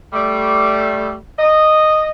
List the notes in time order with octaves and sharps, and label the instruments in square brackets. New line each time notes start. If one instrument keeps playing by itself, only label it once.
[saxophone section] G3 A3
D#5